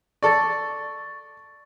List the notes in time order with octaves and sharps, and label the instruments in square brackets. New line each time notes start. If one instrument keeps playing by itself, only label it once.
[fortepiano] A4 D5 [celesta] C#6 A6